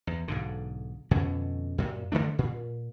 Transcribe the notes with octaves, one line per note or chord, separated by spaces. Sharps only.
E2
B1 G#2 D3
F2 B2 D3 C#4
F#2 A#2
D3 E3 A3 D4
A#2